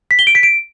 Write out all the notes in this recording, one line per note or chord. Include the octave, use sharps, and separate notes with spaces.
B6
G7
D7
B6
D7